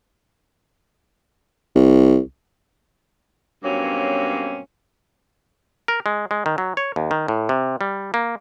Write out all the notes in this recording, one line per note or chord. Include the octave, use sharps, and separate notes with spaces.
C2
G2 B2 F#3 A#3 C4 C#4
A#4
G#3
G#3
D#3
F#3
C#5
D#2
D#3
A2
C3
G3
A#3